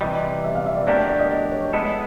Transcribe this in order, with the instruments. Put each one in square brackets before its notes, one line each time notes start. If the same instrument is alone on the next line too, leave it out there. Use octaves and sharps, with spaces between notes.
[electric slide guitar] C3 E3 G3 [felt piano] D#5
[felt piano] E5
F5
E5
D5
[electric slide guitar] F#3 A3 D4 G4 A#4 [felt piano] D5
[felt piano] D5
D5
D#5
D5
C#5
[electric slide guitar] G#3 B3 E4 A4 [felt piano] D#5